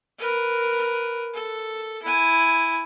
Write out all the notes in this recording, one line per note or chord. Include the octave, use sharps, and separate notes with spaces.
A#4 B4
A4
E4 G#5